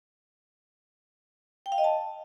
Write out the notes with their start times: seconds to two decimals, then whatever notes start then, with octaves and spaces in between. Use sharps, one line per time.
1.66 G5
1.72 F5
1.78 D#5
1.84 A5